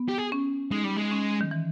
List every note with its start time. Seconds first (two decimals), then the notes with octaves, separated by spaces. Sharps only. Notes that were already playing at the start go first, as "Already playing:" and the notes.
Already playing: B3
0.08 G4
0.18 G#4
0.32 C#4
0.71 G#3 D#4
0.84 G3
0.96 G#3
1.11 C#4
1.41 D#3
1.51 E3